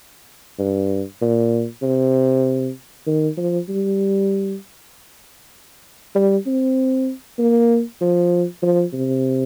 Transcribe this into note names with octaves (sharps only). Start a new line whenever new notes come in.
G2
A#2
C3
D#3
F3
G3
G3
C4
A#3
F3
F3
C3